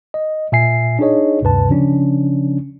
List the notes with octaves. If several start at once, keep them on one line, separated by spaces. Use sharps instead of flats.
D#5
A#2 E5 G#5 C7
D4 D#4 G#4 C#5 D#5
D2 G2 C3 B4 A5
C#3 F3 C#4 D4